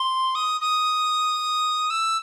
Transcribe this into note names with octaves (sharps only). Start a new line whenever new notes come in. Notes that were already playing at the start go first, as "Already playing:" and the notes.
Already playing: C6
D#6
D#6
E6